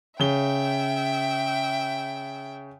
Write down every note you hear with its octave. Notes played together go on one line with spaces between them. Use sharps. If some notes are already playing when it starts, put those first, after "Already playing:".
C#3 E5 G5 G7